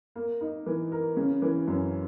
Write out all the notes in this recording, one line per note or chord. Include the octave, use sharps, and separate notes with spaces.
A#3
D#4
E3
A#4
C#3
E3
F#2